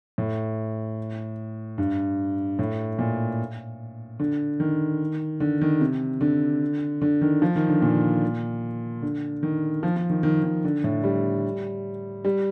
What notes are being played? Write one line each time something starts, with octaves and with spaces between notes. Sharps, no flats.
A2
G2
A2
A#2
D3
D#3
D3
D#3
C3
D3
D3
D#3
F3
D#3
D3
A#2
D3
D#3
F3
F3
D#3
D#3
D#3
D3
A2
G3
G3